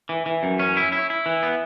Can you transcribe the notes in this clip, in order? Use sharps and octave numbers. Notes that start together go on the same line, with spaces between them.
E3
E3
F#2
C#4
E4
E4
E4
E3
B3